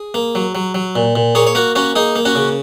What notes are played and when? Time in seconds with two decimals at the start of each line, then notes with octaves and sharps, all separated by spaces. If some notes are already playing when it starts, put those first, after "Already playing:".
Already playing: G#4
0.14 A#3
0.35 F#3
0.55 F#3
0.75 F#3
0.96 A#2
1.16 A#2
1.35 A#3 G#4 C#5
1.47 C#5
1.55 A#3 F#4 A#4
1.75 A#3 C#4 F#4
1.96 A#3 D#4 G#4
2.16 A#3
2.25 C#4 F#4
2.36 C#3